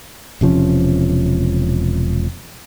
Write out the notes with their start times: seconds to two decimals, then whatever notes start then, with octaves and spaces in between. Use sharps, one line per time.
0.41 E1 C3 F3 C#4